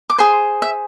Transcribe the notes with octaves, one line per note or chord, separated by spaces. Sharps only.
D6
G#4 C5 C6
E5